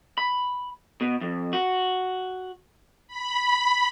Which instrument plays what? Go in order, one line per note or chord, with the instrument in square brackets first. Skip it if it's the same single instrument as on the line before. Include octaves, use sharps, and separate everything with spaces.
[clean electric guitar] B5
B2
F2
F#4
[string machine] B5